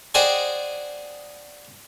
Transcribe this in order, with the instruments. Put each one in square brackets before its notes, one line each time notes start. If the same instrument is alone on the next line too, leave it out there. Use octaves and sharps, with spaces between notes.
[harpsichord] G#4 C5 D5 D#5 F#5 G5